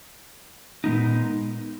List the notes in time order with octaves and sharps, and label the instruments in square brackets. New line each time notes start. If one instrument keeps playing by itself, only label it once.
[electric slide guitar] A#2 G#3 B3 D#4